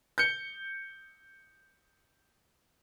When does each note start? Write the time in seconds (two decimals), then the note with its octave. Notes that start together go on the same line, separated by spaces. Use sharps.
0.18 G6 C#7